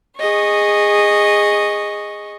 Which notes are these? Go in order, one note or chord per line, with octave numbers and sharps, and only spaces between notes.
G#4 D#5 C#6